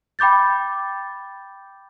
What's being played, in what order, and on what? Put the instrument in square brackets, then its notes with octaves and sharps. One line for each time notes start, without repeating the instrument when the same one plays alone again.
[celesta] G5 B5 D6 G6 A6